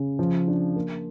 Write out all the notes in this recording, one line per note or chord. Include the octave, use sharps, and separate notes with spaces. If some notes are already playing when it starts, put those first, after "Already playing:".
Already playing: C#3
F3
D4
A#3